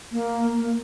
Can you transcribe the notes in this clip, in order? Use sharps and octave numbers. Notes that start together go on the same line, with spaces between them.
A#3
A#3